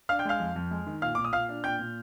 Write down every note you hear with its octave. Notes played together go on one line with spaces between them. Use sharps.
D4 F5 F6
G5 G6
G#3 F5 F6
F2
F2
G#3
D#3
A#2 F5 F6
A#2 D6
D#6
A#2 F5 F6
D4
A#2 G5 G6
A#2